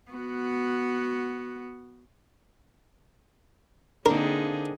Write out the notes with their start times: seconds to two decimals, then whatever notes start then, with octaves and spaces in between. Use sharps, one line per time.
0.12 B3 F#4
4.06 D3 A#3 C4 D4 D#4 G#4 A#4